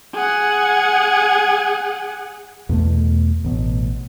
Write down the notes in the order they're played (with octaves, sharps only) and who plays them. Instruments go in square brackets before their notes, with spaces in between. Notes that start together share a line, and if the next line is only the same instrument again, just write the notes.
[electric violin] G#4 F#5
[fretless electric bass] E2 B2 A3
A1 B2